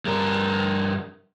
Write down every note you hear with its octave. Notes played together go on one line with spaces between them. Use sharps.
G2 A#4